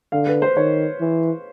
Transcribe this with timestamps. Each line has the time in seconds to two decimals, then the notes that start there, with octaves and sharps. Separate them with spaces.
0.12 D3 F5
0.27 B4
0.42 C5
0.57 D#3 C#5
1.01 E3